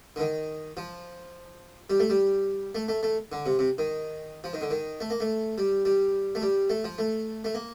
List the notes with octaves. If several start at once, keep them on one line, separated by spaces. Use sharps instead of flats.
D3
D#3
F3
G3
A3
G3
A3
A3
A3
D3
C3
C3
D#3
F3
D#3
D3
D#3
A3
A#3
A3
G3
G3
A3
G3
A3
F3
A3
A3
A#3